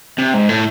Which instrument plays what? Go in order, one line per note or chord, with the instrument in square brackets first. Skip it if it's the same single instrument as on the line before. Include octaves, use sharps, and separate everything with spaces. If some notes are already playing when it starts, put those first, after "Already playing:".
[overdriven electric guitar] C3
G#2
A2